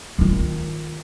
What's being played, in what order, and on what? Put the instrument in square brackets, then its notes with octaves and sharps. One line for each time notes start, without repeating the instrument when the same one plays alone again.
[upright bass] D#3 F4